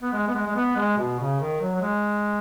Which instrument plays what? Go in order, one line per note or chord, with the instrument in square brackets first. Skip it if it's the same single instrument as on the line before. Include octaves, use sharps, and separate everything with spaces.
[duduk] B3
G#3
B3
G#3
G#3
B3
G#3
B2
C#3
D#3
F#3
F#3
G#3